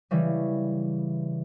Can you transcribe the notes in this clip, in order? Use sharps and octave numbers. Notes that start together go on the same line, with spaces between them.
C#3 E3 G3